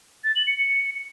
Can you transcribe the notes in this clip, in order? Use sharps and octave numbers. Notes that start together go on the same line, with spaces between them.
A6
F#7
C#7
C#7